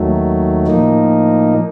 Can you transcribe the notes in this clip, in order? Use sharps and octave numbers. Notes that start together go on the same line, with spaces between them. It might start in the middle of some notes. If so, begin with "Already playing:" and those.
Already playing: D#2 D#3 F#3 A3
A2 F3 A#3 D#4